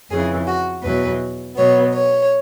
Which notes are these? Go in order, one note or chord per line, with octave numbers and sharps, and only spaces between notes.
F2 C#3 E3 G#4
F#4
E2 B2 F#3 B4
B2 F#3 B3 C#5
C#5